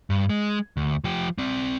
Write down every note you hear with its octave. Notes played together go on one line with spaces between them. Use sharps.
G2
G#3
D2
F3 G4
C4 D5